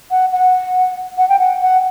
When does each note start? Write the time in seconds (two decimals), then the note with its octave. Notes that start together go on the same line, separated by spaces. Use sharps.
0.11 F#5
0.33 F#5
1.18 F#5
1.29 G5
1.39 F#5
1.61 F#5